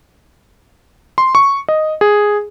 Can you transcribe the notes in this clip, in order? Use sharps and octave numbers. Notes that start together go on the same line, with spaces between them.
C6
C#6
D#5
G#4